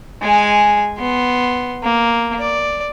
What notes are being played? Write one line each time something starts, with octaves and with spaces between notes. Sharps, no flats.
G#3 G#5
B3 C6
A#3
D5